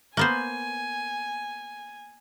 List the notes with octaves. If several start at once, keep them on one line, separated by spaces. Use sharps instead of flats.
A#3 B3 C5 G#5